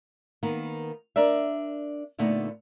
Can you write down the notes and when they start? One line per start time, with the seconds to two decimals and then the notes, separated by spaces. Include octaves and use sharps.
0.43 D#3 A#3 B3
1.16 D4 A#4 D5 E5
2.18 A#2 D3 A3 B3 D#4